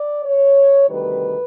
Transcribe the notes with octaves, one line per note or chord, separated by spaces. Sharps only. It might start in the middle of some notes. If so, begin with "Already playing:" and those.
Already playing: D5
C#5
D2 C3 D#3 G3 B4